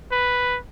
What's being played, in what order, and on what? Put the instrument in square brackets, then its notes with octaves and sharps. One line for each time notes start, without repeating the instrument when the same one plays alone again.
[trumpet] B4